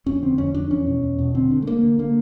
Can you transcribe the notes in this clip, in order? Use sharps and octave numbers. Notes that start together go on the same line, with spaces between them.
F2 C#4
D3 C4
F2 C#4
F2 D4
E2 C#4
B2
E2
B2
D3 C4
D3
A3
D3 A#3
D3
D3 A#3